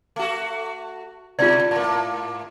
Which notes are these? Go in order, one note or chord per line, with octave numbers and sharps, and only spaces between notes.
A3 F#4
B2 F4 D5
G#2 A#3